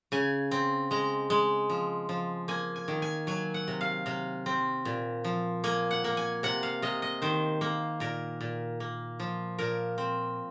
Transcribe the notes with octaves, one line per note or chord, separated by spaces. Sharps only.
C#3 G#5
C4
G#3 A#5
G#3
F3
F3
A#3 G#5
G#5
D#3
G#5
F#3 G#5
F#5
C3
F5
C3 F5
C4
A#2
F3
A#3 G#5
F#5
A#3
G#5
C3 F#5
F5
C3 D#5
D#5
D#3 C5
A#3
A#2 A#4
A#2
A#3
F3
A#2 A#4
C4